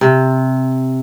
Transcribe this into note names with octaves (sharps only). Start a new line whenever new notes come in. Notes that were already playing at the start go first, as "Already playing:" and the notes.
C3